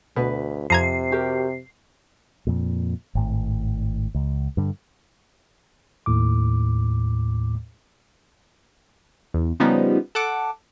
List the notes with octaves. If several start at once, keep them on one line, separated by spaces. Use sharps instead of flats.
D2 B2 B4
F2 C3 A#5 G#6 C7
F#4 G4 A#4
F2 A#2
G#1 A2
C#2
G2 D3
D#2 A2 D6
E2
C#3 F3 G3 B3 D#4
A4 F#5 D6